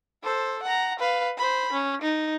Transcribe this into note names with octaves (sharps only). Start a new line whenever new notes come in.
A4 C5
F#5 A#5
B4 F5
C5 B5
C#4
D#4